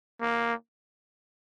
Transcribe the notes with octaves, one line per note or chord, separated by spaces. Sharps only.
A#3